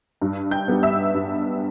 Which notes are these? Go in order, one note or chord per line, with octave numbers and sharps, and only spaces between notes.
G2
G5 G6
G3 B3
E5 E6
G2